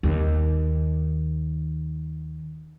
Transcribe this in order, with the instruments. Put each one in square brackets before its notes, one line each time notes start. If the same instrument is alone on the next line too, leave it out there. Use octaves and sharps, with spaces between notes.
[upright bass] D#2 D#3